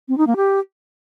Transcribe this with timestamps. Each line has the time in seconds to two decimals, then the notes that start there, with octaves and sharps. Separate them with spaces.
0.08 C4
0.18 D#4
0.27 A#3
0.36 G4